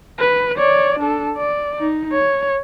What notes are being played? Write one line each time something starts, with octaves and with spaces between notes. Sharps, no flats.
B4
C#5 D5
D4 A4
D5
D#4
C#5